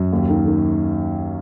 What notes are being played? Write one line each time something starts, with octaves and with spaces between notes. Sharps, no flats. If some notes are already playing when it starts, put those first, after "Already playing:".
Already playing: F#2
D#2
D#3
D#3